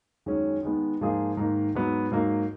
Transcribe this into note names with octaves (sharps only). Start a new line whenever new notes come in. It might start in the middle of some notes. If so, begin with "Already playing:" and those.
F#2 D#3 G#3 C#4 G#4
D#3 G#3 B3
G#2 F3 A#3 F4 G#4
G#2 D#3 A#3
G#2 F#3 B3
G#2 F#3 A#3